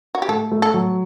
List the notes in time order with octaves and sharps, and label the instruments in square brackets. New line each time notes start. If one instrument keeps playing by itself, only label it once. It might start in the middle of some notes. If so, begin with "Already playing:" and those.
[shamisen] F#4
G4
[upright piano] A3 [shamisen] A4
[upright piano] A3
[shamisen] A4
[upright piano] F#3